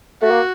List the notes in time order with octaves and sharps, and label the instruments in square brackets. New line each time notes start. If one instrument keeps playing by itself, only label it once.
[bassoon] A3 [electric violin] F#4
[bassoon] A#3